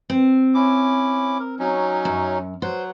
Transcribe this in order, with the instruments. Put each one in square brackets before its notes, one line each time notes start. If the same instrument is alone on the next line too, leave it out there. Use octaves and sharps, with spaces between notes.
[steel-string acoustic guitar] C4
[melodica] C#4 E4 D6
A#4
F#3 C#4 D#4
[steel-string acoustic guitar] F#2
[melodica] F#3 F#5 [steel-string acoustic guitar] C5